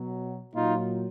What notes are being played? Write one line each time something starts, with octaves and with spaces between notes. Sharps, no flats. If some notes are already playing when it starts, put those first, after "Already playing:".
Already playing: B2 F#3
A#2 F#3 D#4 F4